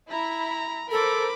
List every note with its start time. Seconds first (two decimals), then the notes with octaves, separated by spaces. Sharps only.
0.11 E4 A#5 B5
0.91 A4 A#4 C5 B5 D6